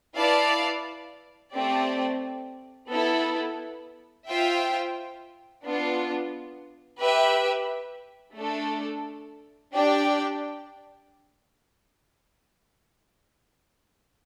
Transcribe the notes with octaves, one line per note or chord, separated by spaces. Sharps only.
E4 B4 D5 F5 A5
A3 C4 G4 D5
B3 E4 A4
F4 C5 E5 G5
B3 D4 F4
G4 B4 E5 G5
A3 D4 A4
D4 G4 D5 G5